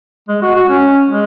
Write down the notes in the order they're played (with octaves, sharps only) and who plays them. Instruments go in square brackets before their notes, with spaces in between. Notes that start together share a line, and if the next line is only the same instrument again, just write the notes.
[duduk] G#3
F#4
F#4
C#4
G#3